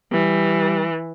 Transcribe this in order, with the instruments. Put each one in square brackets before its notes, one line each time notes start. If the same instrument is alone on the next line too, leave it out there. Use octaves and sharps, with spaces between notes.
[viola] E3 [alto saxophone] G3